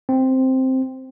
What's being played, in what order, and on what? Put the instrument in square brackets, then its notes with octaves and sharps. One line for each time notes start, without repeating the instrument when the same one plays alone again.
[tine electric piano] C4